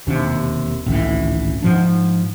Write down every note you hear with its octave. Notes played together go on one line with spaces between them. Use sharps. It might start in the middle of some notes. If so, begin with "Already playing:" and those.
E1 D#2 C3 D4
G#1 C#2 A2 E3
G#2 F3 D4